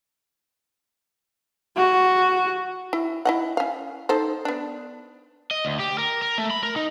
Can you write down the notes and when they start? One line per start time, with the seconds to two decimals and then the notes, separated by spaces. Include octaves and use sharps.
1.77 F#4
2.93 E4
3.25 E4 D#5 F#5
3.57 C#4 F5
4.09 D#4 A4 C5
4.45 B3 D4
5.51 D#5
5.65 D2
5.80 G4
5.98 A#4
6.22 A#4
6.38 A3
6.51 B5
6.63 A#4
6.76 D#4